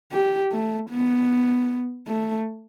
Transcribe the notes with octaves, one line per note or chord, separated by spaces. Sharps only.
G4
A3
B3
A3